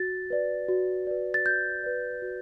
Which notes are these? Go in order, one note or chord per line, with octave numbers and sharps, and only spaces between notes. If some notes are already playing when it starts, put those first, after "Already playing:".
Already playing: F#4 A6
B4 D5
F#4
B4 D5
A6
F#4 G6
B4 D5
F#4